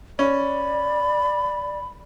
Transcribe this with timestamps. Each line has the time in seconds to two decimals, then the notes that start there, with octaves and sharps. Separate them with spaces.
0.19 C#4 D5 B5